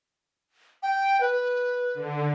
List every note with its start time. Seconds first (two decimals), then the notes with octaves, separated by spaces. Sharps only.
0.83 G5
1.21 B4
1.94 D3